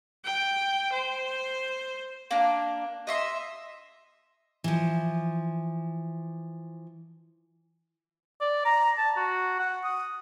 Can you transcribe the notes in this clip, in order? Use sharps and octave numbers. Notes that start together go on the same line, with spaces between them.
G5
C5
A#3 D4
D#5 E5 C6
E3 F3
D5
A#5
A5
F#4
F#5
D#6